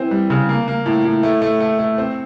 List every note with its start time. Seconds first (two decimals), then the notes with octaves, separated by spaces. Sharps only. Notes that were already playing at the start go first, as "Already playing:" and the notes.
Already playing: E3 C4
0.11 G3
0.30 C#3
0.49 A#3
0.68 A#3
0.86 A2
1.05 A2
1.23 A3
1.42 A3
1.60 A3
1.79 A3
1.98 C4